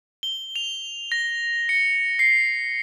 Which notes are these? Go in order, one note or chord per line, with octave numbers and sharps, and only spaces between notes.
G7
F7
A#6
C#7
C7